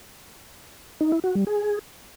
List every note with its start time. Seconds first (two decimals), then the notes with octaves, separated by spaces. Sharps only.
1.01 D#4
1.12 E4
1.24 F#4
1.35 G3
1.47 G#4